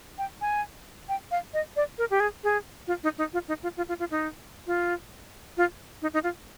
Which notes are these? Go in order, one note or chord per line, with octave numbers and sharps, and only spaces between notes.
G5
G#5
G5
F5
D#5
D5
A#4
G4
G#4
G#4
F4
D#4
D#4
F4
D#4
F4
F4
F4
F4
D#4
F4
F4
D#4
D#4
F4